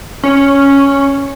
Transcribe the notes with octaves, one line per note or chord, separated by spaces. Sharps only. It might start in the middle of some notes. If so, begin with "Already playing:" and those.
C#4